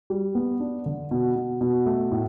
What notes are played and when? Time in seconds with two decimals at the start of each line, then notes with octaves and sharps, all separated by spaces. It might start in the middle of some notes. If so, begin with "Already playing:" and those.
0.10 G3
0.35 B3
0.60 D4
0.86 D3
1.11 B2
1.36 B2
1.61 B2
1.86 A3
2.11 A2